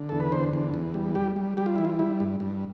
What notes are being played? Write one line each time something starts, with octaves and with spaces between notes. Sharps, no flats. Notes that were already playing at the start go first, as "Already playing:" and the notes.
Already playing: D3
E2 A4
B4
D3 C5
E2
E2
G3
G3 G4
G3
G3 G4
F4
E3 E4
F4
G3 E4
G2
G2